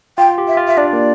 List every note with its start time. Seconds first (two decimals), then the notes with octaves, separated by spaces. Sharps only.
0.18 F4 G5
0.38 G4
0.48 E5
0.57 F4
0.68 E5
0.77 D4 D5
0.93 A#3